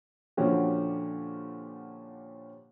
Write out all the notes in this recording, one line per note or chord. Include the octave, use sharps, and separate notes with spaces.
A#2 D3 F3 C#4 F#4 G4